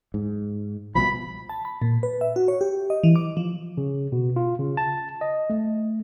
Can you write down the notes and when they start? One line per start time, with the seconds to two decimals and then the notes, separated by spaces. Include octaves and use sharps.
0.14 G#2
0.95 C2 B2 F3 B5
1.49 A5
1.65 B5
1.82 A#2
2.03 B4
2.21 E5
2.36 F#4
2.48 C#5
2.61 G4
2.90 D#5
3.04 E3
3.16 D6
3.37 F3
3.77 C#3
4.12 B2
4.36 F4
4.59 C#3
4.77 A5
5.21 D#5
5.50 A3